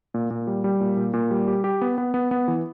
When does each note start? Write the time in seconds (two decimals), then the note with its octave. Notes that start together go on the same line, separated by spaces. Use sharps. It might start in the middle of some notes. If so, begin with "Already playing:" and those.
0.14 A#2
0.30 A#2
0.47 G3
0.64 G3
0.80 A#2
0.97 A#2
1.14 A#2
1.31 G3
1.48 G4
1.64 G4
1.81 B3
1.98 B3
2.14 B3
2.31 B3
2.48 E3